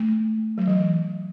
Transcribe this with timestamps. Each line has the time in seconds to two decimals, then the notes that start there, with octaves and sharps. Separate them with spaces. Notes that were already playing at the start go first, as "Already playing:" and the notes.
Already playing: A3
0.58 F#3
0.67 E3